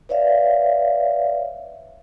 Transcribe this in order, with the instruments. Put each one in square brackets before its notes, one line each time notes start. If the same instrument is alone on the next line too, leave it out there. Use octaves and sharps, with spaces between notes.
[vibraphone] B4 C#5 D5 E5 F5